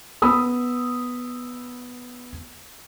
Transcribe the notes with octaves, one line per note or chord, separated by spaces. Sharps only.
B3 B5 D#6 E6